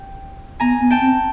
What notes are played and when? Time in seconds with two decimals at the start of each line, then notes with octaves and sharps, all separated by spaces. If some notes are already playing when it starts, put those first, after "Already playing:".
Already playing: G5
0.60 B3 G#5 A#5
0.81 B3
0.91 G5 A5
1.01 C4